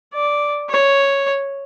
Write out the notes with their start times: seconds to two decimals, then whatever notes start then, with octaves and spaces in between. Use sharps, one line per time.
0.14 D5
0.70 C#5